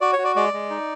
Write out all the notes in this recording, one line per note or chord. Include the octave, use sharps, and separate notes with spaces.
F#4 D5
C#5
F#4
D5
G#3 D5
G#3
D#4